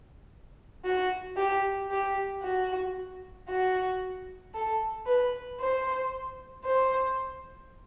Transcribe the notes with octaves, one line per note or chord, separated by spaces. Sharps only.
F#4
G4
G4
F#4
F#4
A4
B4
C5
C5